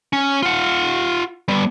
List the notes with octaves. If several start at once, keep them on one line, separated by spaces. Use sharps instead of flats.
C#4
F4 F#5
G3 B3